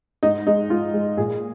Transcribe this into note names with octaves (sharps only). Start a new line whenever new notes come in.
G#2 D#4
G#3 D#4
G#2 F4
G#3
A#2 G#4